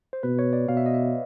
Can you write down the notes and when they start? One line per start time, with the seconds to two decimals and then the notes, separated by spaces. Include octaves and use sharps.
0.13 C5
0.23 B2 B4
0.39 C#5
0.53 D5
0.68 B2 F5
0.77 E5
0.86 D#5
0.94 E5